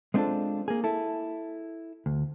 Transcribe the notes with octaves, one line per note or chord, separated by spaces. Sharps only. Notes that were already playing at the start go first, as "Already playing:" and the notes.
G#3 B3 C4 D4 F4 A4
A#3 G#4
E4 A4
D2